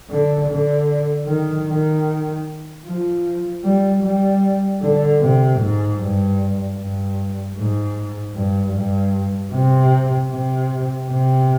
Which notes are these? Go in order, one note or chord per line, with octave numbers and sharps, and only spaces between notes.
D3
D3
D#3
D#3
F3
G3
G3
D3
C3
G#2
G2
G2
G#2
G2
G2
C3
C3
C3